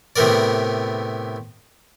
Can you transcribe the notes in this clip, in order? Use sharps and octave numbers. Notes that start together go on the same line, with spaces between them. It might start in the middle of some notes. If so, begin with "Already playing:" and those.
A2 C3 B3 A#4 D5